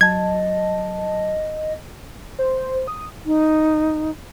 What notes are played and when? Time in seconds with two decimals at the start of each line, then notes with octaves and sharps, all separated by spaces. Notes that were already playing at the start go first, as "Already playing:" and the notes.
0.01 F#3 D#5 A5 G#6
2.39 C5
2.87 D#6
3.26 D#4